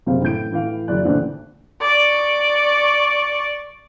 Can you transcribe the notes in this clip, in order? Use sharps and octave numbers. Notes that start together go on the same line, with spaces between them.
F#1 C3 C4 C5 F5
A2 E3 G6 D7
A2 E3 F5
F#1 E3 F#3 D5 F#6
A1 A#2 D3 C5
D5 C#6